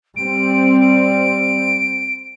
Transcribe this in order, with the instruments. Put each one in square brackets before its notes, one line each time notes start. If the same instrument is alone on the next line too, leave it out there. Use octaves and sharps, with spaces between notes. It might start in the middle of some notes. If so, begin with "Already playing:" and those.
[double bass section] G3 C4 [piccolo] D7
[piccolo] D7